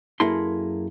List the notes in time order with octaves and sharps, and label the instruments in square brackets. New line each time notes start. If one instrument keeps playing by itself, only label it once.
[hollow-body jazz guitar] F#2 A#3 E4 G#4 A4 C6